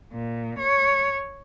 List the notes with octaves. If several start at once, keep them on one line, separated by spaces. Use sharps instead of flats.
A#2
C#5